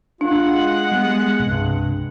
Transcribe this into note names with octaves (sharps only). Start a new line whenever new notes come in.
G#3 D4 F4 F#5
G3 B3
C2 G2 C3